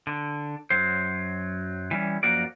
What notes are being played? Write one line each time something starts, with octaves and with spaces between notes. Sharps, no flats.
D3
F#2 F#3 C5
E3 G3 C#4
F#2 F3 A#3 F#4 A#4 D5